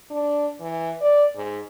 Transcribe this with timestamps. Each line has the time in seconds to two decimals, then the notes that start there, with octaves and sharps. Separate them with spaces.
0.11 D4
0.60 E3
1.01 D5
1.36 G#2